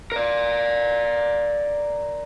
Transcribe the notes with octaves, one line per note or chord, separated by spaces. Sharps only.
A#4 D5